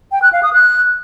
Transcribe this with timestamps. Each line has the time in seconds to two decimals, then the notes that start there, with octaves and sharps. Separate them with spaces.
0.12 G5
0.22 F#6
0.33 F5
0.43 D#6
0.53 F#6